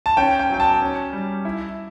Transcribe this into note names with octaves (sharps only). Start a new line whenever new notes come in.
A5
C#4 G5
G5
F#3 G5
A5
C#4
G3
E4